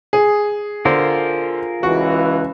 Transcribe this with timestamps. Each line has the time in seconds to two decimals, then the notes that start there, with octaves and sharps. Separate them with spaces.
0.13 G#4
0.85 D3 F4 A#4 C5
1.83 C#2 E3 F#4